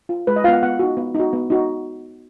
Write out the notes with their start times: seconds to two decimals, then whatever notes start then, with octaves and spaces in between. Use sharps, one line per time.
0.09 F4
0.27 G#3 B4
0.36 D#5
0.44 F4 F5
0.48 B3 F#5
0.63 B3 F#5
0.79 D#4 F#4
0.97 B3
1.15 D#4 F#4
1.33 B3
1.50 D#4 F#4